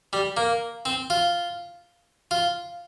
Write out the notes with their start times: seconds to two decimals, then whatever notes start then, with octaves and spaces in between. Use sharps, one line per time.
0.13 G3
0.37 A#3
0.85 C4
1.10 F4
2.31 F4